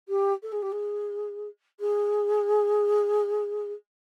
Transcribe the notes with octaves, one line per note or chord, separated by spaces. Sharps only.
G4
A4
G#4
G4
G#4
G#4